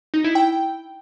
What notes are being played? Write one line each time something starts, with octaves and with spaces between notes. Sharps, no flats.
D#4
E4
G5